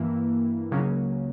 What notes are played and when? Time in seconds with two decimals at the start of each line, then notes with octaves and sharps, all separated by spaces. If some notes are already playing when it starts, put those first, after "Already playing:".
Already playing: G2 E3 A#3 E4
0.71 C#2 C#3 F#3 A#3 C#4